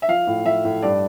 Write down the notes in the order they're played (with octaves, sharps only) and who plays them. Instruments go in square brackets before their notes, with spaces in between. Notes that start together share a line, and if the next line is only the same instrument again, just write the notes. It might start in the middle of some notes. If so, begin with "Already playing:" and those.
[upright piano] E5
F3 F5
A2
F3 E5
A2
G2 D5